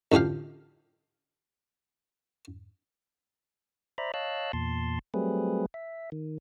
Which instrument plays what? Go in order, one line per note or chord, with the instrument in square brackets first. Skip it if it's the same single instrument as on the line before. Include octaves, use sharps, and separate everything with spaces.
[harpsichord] A1 D3 F3 G4 F5
[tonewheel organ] C5 D5 E5 A#5 B5
C#5 D#5 F5 A5 E6 F#6
E2 A#2 A5 C6
F#3 G3 A3 C4 G#4 B4
E5
D#3